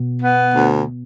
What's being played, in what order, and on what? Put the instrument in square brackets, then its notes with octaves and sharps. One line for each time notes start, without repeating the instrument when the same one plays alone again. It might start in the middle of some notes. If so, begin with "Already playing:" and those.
Already playing: [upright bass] B2
[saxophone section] B3
D2